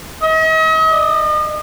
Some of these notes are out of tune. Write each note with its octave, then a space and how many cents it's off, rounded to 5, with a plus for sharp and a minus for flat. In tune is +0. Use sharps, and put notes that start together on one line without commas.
D#5 +40
D#5 -40